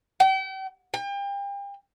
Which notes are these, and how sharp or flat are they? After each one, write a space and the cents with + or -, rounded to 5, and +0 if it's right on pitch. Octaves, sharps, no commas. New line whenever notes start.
G5 -40
G5 +35